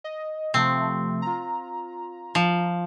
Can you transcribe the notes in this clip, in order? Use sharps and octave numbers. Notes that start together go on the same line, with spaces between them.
D#5
C3 F3 A3 C4
F4 A#5
F3